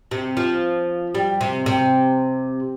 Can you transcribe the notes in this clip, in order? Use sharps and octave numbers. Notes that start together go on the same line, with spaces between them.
C3
F3
G3
C3
C3